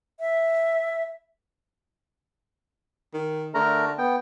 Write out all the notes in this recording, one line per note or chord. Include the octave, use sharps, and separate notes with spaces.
E5
D#3
D3 A3 A#4 A#5
B3 G5